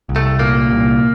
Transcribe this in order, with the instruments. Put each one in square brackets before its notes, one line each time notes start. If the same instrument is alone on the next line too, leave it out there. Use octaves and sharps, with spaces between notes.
[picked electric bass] C2
[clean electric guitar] A3
[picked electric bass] A#2 [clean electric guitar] A#3
[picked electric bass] C2